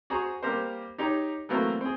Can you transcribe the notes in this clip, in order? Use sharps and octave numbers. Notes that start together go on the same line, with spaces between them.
F#4 G#4 C5 A#5 C#6
G3 A#3 G4 A#4 C5
D#4 G4 C#5 A#5
E3 F#3 A3 A#3 C4
C4 G#4